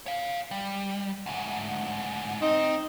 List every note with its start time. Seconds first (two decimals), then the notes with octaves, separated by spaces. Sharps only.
0.06 C#5 F5
0.51 G3
1.26 D2 G#2
2.42 C4 D#4